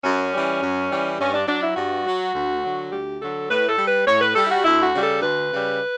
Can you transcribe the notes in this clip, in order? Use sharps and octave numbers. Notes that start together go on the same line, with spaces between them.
F#2 C#4
E3 G3
F#2
E3 G3
G2 C#4
D4
F#3 D4
E4
G2 F#4
F#3
D2
D3 F#3
D2 G4
D3 F#3 A4
A2 B4
A4
G3
B4
A2 C#5
B4
G3 A4
E4
F#4
D2 E4
F#4
C#3 G3
A4
D2 B4
C#3 G3